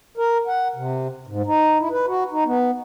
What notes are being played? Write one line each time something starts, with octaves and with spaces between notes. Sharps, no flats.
A#4
F#5
C3
G#2
D#4
E4
B4
F#4
D#4
B3